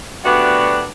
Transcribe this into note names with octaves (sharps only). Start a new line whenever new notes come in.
D2 B3 D4 F#4 G4 F#5